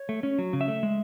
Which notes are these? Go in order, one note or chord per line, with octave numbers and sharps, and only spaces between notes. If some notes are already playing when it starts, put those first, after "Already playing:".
Already playing: C#5
A3
C#4
F#3
C#3
E5
A3
G#3